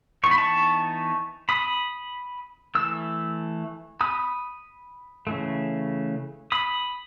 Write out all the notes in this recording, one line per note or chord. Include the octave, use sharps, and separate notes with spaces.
E3 B3 D#4 C#6
B5
A5 C#6
B5 D#6
E3 A3 E6
B5 D#6
C#3 E3 A3
B5 D#6